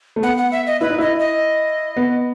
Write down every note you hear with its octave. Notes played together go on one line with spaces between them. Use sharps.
A3
B3 F#5
F#5
E5
D#5
E4 B4
D#4
E4 D#5
D#5
B3